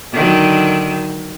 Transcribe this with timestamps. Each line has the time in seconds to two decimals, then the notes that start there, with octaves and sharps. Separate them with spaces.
0.12 D3 D#3 F#3